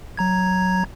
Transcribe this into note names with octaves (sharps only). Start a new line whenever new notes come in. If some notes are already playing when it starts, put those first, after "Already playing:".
F#3 A#5 G#6